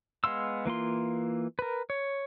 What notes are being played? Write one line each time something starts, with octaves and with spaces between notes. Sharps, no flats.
G#3 B3 F5 C6 E6
E3 A#3 F4 C6
A#4 B4
C#5